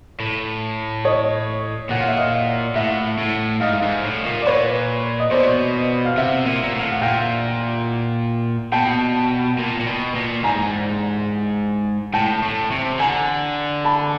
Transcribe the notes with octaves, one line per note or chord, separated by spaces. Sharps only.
A2
C#5 D#5
A#2 F#5
F5
E5
D#5 F5
A2 E5 F#5
A2
G#2 D#5 F5
G#2
A2
A#2
D5
A#2 B4 C#5
D#5
B2 C5 D5
F5
C3 E5 F#5
A#2
A#2
A2
F5
F#5
A#2 F5 G5
B2 G5 A5
A#2
A#2
B2
A#2
G#2 G#5 A#5
A2 G5 A5
A2
C3
D3 G#5 A#5
A5 B5